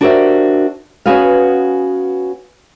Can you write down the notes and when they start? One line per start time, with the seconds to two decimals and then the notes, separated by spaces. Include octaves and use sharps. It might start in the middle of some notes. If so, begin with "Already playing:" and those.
0.01 D4 F#4 G4 A#4 C5 E5
1.06 B3 C#4 F#4 G#4 B4 F5